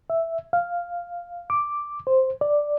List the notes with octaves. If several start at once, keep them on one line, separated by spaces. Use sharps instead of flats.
E5
F5
D6
C5
D5